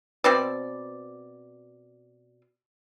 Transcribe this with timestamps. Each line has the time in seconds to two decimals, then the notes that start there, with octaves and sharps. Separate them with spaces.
0.24 B2 C4 D5